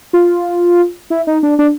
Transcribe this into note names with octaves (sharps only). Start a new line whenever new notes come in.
F4
E4
D#4
D4
D4